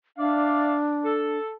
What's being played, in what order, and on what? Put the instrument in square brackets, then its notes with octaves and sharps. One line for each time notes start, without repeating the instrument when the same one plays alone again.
[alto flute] D4 [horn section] D5 E5 F5
[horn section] A4